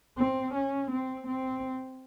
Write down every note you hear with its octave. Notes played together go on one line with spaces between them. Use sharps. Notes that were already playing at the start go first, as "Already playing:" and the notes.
C4
C#4
C4
C4